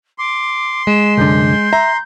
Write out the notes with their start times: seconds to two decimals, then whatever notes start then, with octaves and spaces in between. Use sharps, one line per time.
0.18 C6 D6
0.87 G#3 E7
1.17 C2 F#2 D3 G6
1.73 E5 A#5